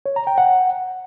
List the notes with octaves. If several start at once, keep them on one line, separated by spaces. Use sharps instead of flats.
C#5
A#5
G5
F#5